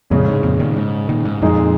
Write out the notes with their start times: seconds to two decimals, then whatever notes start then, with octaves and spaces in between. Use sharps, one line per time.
0.10 F2 A#2 C#3 G#3 C#4
0.27 G#2
0.43 F2 A#2
0.59 A#2 D#3
0.77 G#2
1.09 A#2 D#3
1.25 G#2
1.42 F2 A#2 G#3 D#4 G#4